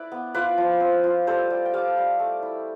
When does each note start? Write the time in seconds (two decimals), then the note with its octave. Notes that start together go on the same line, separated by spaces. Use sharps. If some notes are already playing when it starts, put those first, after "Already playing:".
Already playing: E4 B4 D5
0.12 B3
0.34 F4 B4 D5
0.58 F3
0.80 C4
1.04 F4
1.27 G3 A4 C5
1.50 G3
1.65 G5
1.74 G3 D5 F5
1.97 G3
2.19 A3
2.43 E4